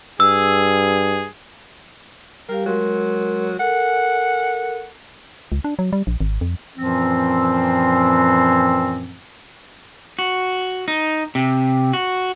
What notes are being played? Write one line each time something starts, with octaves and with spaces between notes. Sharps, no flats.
G2 G#4 E6
G3 G4 A#4 F5
F#3 G#3 A#4 C6
A4 A#4 F#5
C#2
D4
F#3
G3
A#1
G#1
F2
F#2 A#2 E3 F3 C4
F#4
D#4
C3
F#4